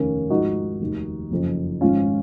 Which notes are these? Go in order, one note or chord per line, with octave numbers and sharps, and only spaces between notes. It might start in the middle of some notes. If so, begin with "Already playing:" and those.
Already playing: F1 D#2 D#3 A#3 C#4
G#1 G#2 F3 D#4 F#4
F1 D#2 D#3
F#1 F2 C#3 F3
G#1 G#2 F3 C#4 F4